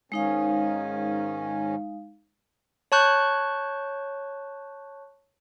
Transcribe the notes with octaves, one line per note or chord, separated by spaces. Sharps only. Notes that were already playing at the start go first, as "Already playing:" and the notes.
G#2 D#3 G#3 C#4 D#4 F5
C#5 A5 C#6 F#6 G6